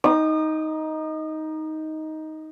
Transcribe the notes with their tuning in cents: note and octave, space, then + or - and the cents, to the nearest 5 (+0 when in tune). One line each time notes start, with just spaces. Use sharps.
D#4 +10 D#6 -35